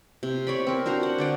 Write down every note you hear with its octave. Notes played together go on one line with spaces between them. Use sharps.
C3
C#5 D5 B5
C4 A#4
D4 F#4 C5 A#5
F#5
D3 D5 G5